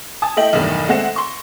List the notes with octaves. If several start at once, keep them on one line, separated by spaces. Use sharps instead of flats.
G#5 A5 D#6
A3 E4 D#5 G5 F#7
B1 E2 G2 D#3 A3
G#3 A3 C4 F#5 A#6 E7
C6 C#6